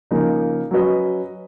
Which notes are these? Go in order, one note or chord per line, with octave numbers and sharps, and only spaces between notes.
C#3 F3 A#3 D#4 A#4
F#3 C#4 F#4 B4 D#5